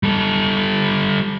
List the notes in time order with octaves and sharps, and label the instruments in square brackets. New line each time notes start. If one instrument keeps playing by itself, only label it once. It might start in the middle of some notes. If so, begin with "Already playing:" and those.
[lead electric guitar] G3 A4